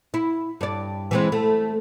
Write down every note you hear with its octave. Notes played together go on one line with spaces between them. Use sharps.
E4
G2 D5
E3 G#3 C4
A3